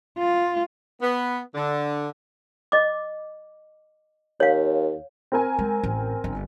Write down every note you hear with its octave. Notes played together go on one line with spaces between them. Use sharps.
F4
B3
D3
D#5 D6
D#2 C#5 F5
C4 A#4 G#5
G#3
A1
G1